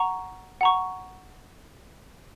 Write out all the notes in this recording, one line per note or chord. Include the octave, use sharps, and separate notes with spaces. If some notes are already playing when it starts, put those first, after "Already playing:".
Already playing: F#5 A#5 C#6
F#5 A#5 C#6